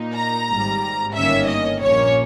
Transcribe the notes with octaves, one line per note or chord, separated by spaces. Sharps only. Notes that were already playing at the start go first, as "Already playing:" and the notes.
Already playing: A#2 A#3 D#4
A#5
G#1 G#2 G3
G1 G2 D#3 A#3 C#4 E5
D#5
A#1 A#2 A#3 C#4 C#5